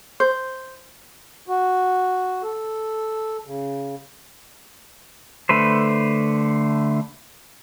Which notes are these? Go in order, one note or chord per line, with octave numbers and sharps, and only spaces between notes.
C5
F#4
A4
C#3
D3 A3 B4 C5